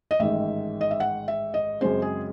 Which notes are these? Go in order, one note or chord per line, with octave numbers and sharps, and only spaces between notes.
D#5
A1 G#2 D#3 E5
D#5
E5
F#5
E5
D#5
F#2 C#3 G#3 C4 C5
G#4